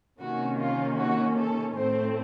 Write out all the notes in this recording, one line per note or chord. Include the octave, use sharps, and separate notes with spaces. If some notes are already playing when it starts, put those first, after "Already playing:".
C3 D#3 A#3 C#4 F#4
F4
F#4
A4
A2 A3 C4 C5